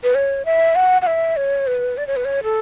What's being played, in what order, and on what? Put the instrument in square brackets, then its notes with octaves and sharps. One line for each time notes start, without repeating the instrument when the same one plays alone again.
[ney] B4
C#5
E5
F#5
F#5
E5
C#5
B4
D5
C#5
B4
C#5
A4